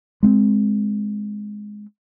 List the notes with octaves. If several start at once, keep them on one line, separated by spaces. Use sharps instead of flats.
G#3 A#3 C4